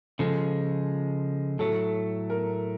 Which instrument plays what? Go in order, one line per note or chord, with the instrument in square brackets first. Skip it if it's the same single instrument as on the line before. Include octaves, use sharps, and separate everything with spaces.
[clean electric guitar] C#3 F3 G#3 [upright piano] A4
[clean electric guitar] A2 F#3 A3 [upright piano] A4
[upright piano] A#4